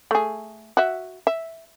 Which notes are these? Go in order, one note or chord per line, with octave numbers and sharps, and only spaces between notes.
A3 G#4
F#4 E5
E5